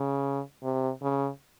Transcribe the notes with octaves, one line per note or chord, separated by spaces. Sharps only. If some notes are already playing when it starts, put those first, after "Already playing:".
Already playing: C#3
C3
C#3